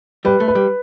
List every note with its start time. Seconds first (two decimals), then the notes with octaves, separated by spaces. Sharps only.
0.25 G3 B4
0.40 A3
0.48 B4
0.55 G3